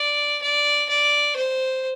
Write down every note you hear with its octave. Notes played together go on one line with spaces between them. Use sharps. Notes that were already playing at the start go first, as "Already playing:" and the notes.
Already playing: D5
D5
D5
C5